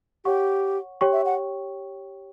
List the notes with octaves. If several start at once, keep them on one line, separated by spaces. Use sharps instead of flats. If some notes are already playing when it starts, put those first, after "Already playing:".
G4 C#5 F#5 C#6
G4 C#5 G5 C#6
E5
F#5